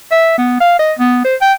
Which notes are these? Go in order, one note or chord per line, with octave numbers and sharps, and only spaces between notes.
E5
B3
F5
D#5
B3
C5
G5